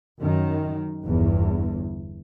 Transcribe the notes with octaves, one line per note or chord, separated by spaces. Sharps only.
F#2 D#3
G1 E2